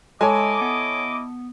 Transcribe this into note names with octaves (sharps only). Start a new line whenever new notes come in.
G#3 E4 A4 C#5 D#5 G#5 D6
B3